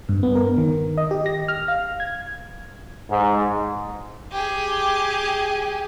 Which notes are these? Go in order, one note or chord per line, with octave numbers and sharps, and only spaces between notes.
G2
B3
A#4
D#3
D#5
G4
A#6
F6
F5
G#6
G#2
G4 G#4